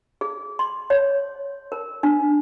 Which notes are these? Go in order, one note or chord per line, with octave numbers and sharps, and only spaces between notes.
G#4
C6
C#5
A#4
D4